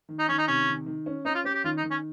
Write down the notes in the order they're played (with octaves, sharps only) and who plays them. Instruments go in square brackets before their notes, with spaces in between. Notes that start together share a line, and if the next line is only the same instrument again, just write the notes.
[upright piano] D#3
[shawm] D#4
[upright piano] D#3 [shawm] C#4
[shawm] D#4
[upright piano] C3 [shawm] C#4
[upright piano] D#3
D#3
C#4
[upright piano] C#4 [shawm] D#4
[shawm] F4
[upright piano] C#4 [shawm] G4
[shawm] G4
[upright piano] D#3 [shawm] F4
[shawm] D#4
[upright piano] D#3
[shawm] C#4